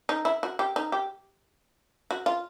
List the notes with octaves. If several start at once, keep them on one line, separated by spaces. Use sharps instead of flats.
D#4
E4
F#4
G4
D#4
G4
F#4
F4